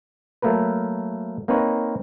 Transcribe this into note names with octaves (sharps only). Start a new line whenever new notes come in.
F#3 A3 A#3 A#4 B4
A#3 C4 D#4 B4 C#5